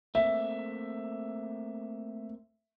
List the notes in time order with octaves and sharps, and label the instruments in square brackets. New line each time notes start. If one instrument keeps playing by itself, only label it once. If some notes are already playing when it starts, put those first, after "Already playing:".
[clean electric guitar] A3 A#3 C4 [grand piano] E5